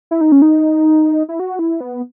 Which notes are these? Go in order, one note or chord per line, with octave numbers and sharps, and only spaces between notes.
E4
D#4
C#4
D#4
E4
F#4
E4
B3